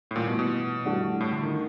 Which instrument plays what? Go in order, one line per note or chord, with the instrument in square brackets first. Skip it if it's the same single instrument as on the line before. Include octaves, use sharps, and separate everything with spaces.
[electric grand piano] A2
[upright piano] A1 G2 E3 [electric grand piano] A#2
[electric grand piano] B2
B2
[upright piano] G2 E3 A3 D4 F#4
[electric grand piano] A2
D3
D#3